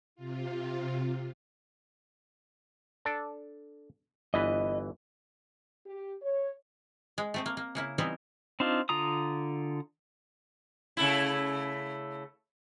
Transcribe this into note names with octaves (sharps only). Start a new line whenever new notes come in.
C3 F4
D4 A4 D5
G1 E3 B4 D#5
G4
C#5
G#3
A3 C4 D#5
A#3
A#3
C#3 A#3 E4
E3 G3 B3 C4 D#4 E4
C4 D4 D#4 F4
D3 F4 A#5 D#6
C#3 A3 E4